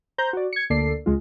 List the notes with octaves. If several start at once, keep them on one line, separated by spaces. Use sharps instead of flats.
C5 A#5 G6
F#4 D5
G#6 C#7
D2 A#3 A4 D5 C7
C#2 G#3 F4